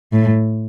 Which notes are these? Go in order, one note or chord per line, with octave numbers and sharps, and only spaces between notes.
A2